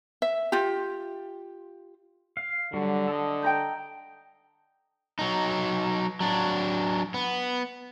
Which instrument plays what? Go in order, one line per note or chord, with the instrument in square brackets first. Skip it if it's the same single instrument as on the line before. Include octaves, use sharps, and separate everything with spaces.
[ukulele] E5
F4 G4
[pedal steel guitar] F5
[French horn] D3 [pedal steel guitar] F#3 G3 F#4
[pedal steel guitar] A4 D#5
[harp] G5 A#5 G6
[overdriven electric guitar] F#3 D#4
F#3 D4
B3